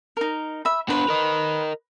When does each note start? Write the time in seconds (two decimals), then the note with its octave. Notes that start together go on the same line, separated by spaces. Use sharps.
0.17 D#4 A#4
0.65 E5 B5
0.89 B3 D4 B4 C5
1.09 A#4 D#5